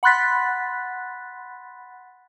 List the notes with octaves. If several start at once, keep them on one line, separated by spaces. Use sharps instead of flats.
F#5 B5 C6 F#6 A6 B6